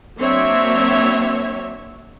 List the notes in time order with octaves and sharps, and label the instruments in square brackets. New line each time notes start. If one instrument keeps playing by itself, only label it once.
[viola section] F#3 A#3 C4 D4 C#5 E5